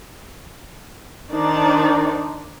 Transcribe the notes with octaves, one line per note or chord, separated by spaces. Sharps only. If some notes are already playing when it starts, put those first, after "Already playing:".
D#3 D4 D#4 C5 D5